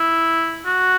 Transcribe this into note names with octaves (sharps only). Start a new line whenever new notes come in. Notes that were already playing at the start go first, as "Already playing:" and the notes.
Already playing: E4
F#4